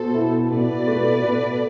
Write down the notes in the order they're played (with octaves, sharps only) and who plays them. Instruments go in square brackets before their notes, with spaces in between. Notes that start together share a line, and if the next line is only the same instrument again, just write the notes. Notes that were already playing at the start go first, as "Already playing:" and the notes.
Already playing: [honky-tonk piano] B2 [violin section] A4 C5
[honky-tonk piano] E4
[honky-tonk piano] B2 [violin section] B4 D5
[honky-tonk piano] A3
B2